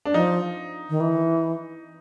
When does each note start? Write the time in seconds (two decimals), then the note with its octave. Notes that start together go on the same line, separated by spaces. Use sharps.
0.05 D4
0.14 F3 D#4
0.90 D#3
1.00 E3